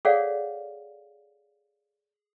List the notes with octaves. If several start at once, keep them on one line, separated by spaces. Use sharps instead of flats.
G#4 A4 C#5 D5 F5 F#5